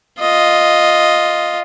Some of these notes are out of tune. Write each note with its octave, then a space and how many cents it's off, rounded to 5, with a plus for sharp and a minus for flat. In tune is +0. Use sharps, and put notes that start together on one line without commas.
F4 +0 D#5 +0